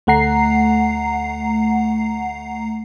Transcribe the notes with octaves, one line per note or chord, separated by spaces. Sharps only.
D2 A3 F#5 A#5 C7